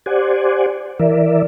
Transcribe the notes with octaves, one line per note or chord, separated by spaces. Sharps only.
G4 C5 D5 F#5 G#5
E3 A#4 D5 E5